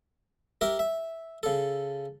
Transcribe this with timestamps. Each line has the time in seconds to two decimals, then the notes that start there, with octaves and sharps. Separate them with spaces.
0.61 G4 A#4 E5
0.79 E5
1.43 C#3 A4